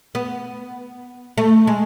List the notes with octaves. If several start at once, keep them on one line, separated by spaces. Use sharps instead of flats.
B3
A3
G#3